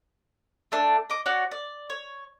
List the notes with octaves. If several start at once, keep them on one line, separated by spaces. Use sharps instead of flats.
A3 D4
D#5 D6
F#4 C#5 D5
D5
C#5